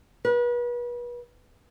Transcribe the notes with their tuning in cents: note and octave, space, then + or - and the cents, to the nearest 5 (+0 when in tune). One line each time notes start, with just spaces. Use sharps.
B4 -35